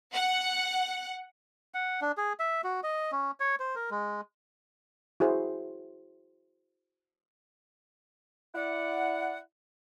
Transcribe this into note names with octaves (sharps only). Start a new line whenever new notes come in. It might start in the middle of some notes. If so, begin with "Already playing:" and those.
F#5
F#5
D4
G#4
E5
F#4
D#5
C#4
C#5
C5
A#4
G#3
E4 F#4 G#4 C5
E4 D5 F#5